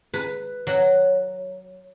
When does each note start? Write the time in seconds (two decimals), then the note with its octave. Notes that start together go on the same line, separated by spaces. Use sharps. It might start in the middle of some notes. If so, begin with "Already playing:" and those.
0.14 B4
0.67 F#3